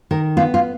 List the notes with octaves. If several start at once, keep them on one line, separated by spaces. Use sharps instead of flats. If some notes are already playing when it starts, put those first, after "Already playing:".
D#3 A#4
B3 F4
F4